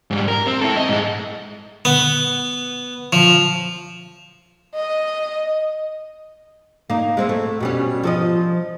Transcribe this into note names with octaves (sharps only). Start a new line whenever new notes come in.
G#2 G3
A#4
C4
E4 A4
D#5
G#2 G#3
B3
F3
D#5
A#3 D#4
G#3 C4 E4
A3
B2 G3 C#4
F3 A4 D#5